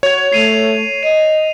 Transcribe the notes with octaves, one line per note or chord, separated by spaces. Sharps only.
F#4 C#5 G#6 F7
A3 C7 D#7 F7
D#5 D#7